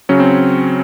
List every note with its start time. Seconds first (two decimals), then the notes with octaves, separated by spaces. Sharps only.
0.09 C#3 F#3 C#4
0.20 C4